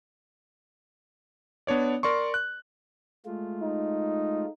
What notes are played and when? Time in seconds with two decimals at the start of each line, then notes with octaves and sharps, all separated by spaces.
1.67 B3 D4 C#5 D5
2.03 A#4 D5 C6 C#6
2.34 F#6
3.26 G#3 A3 F4
3.62 D#4